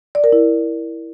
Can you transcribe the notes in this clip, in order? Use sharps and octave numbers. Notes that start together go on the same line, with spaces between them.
D5
A#4
E4